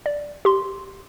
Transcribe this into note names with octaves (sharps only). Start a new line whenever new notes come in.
D5
G4 C6